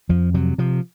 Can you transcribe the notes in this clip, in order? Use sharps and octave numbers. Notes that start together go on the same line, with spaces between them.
F2 F3
C3 F#3
C3 F3